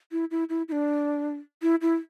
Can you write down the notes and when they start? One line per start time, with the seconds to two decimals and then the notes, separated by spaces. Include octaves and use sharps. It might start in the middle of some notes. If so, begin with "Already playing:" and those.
0.12 E4
0.31 E4
0.49 E4
0.68 E4
0.72 D4
1.62 E4
1.82 E4